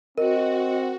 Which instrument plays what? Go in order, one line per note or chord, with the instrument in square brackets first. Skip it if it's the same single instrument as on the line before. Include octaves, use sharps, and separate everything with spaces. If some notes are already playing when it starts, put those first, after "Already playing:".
[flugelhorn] C4 [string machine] F#4 [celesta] A#4 [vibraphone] D#5